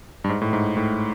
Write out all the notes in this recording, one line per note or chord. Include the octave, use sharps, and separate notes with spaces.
G2
G#2
A2
G#2
A2